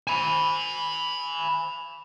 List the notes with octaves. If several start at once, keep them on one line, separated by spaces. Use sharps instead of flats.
G#5 B5